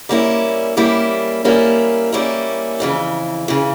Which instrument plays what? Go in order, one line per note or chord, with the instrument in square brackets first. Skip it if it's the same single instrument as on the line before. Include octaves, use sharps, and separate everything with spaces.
[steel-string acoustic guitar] G3 A#3 C#4 E4
G3 A#3 C#4 E4
G3 A#3 C#4 E4
G3 A#3 C#4 E4
F2 C#3 E3
C#3 E3